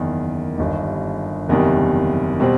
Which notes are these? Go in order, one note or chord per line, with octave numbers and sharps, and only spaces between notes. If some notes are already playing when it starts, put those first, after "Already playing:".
Already playing: F#1 E2 D#3
G1 G2 D#3
F#1 E2 C3 D#3 G3
B2 G3 C4